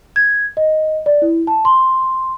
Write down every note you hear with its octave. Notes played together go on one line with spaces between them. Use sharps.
G#6
D#5
D5
E4
A5
C6